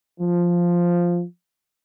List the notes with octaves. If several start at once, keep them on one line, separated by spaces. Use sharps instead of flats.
F3